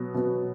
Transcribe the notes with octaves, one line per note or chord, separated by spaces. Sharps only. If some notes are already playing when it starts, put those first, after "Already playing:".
Already playing: B2 F#3 B3
B2 F#3 B3